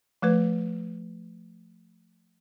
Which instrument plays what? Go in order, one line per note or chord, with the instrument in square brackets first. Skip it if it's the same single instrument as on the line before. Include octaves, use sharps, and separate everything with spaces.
[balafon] F3 A3 B4